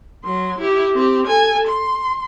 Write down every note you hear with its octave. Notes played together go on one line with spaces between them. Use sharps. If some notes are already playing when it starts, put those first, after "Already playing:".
F#3 C6
E4 G4
C4 G4
A4 G#5
C6